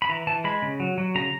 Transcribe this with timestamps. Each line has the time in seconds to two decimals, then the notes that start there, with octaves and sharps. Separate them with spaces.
0.02 B5
0.09 E3 A#5
0.27 E3 A5
0.44 G#3 B5
0.62 C#3
0.80 F#3
0.98 F#3
1.15 C#3 A#5